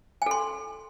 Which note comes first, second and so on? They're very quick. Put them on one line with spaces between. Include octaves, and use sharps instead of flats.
G#5 A4 C6